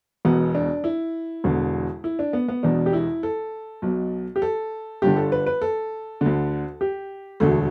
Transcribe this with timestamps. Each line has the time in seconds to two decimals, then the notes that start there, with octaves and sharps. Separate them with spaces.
0.25 E1 E2 B2 B3
0.55 D4
0.84 E4
1.44 E1 E2 D3
2.04 E4
2.19 D4
2.33 B3
2.48 B3
2.63 E1 E2 B2 D4
2.86 G4
2.93 E4
3.23 A4
3.82 B1 B2
4.36 G4
4.42 A4
5.02 G1 G2 D3 G4
5.17 A4
5.32 B4
5.46 B4
5.62 A4
6.21 D2 D3
6.81 G4
7.40 E1 D2 D3 A3